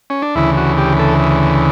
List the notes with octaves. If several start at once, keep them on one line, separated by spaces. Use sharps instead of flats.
C#4
D4
D2 C#3 E3 E4
F#4
G4
A4